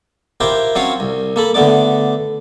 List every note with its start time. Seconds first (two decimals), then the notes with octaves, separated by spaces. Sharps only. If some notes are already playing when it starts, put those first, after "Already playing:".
0.40 E4 F4 G4 A#4 C5 G5
0.75 F#3 C4 C#4 F4 C#5 F5
1.00 C2
1.36 A#3 A4 B5
1.54 D3 A3 B3 D5 D6